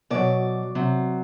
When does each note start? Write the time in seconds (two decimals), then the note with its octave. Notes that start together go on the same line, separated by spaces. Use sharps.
0.10 B2 F#3 D5
0.75 C3 F#3